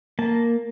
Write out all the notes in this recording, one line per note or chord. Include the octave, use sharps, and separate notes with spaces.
A#3 A5